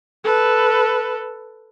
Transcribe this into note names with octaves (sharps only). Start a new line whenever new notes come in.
A4 B4